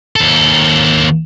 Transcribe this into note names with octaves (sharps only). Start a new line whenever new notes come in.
D#2 A4